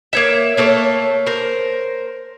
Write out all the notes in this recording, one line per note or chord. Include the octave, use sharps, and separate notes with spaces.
A#3 C#5 E5
A3 A#3 A4 C#5
A#4 C5